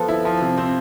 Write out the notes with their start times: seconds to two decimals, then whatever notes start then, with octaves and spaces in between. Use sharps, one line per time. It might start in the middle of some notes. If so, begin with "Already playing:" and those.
Already playing: F3 B3 A4
0.08 E4
0.25 F3
0.41 C3
0.58 C4